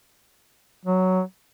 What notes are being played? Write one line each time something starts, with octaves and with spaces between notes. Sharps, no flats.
F#3